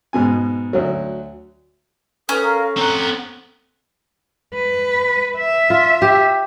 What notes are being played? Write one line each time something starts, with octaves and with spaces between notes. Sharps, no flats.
G#2 B2 G#5
D2 F#3
C#4 A4 B4 D#5 D#6
A#4 F5
C4 F#5 A#5
B4
E5
F4
G4